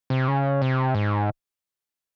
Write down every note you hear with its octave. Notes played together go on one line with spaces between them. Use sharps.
C3
C#3
C3
G#2